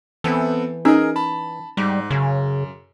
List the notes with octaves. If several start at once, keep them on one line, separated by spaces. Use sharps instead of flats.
E3 B3 C4 A4
C#4 D#4 G#4 A#4 D#5 E6
A5 B5
G#2 G3
F#2 C#3